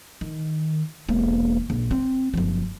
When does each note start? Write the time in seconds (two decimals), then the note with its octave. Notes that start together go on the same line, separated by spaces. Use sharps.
0.21 D#3
1.09 E1 A#3
1.70 A#1
1.91 C4
2.34 F#1 F3